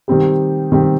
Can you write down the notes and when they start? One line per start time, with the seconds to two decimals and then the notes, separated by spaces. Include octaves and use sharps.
0.08 D#3 G3 C4 G4
0.72 D#3 G3 C4 G4